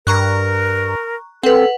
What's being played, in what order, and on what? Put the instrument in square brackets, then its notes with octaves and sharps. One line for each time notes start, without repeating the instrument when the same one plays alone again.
[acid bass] G2 [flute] A#4 [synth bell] A#5 C#6 F#6
[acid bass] C4 [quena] A4 [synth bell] B4 F#5